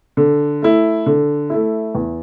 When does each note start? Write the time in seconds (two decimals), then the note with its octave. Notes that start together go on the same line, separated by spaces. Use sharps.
0.17 D3
0.62 A3 E4
1.06 D3
1.50 A3 E4
1.95 E2